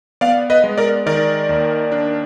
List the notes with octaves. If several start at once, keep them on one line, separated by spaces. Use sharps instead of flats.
B3 D5 F5
B4 D#5
G#3
A#4 D5
D#3 A#4 D5
D#2
D4